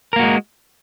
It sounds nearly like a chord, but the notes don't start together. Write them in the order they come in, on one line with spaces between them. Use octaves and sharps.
A#4 A#3 F#4 G#3